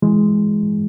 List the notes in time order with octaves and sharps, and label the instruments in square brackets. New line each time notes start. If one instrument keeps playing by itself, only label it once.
[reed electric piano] E3 G#3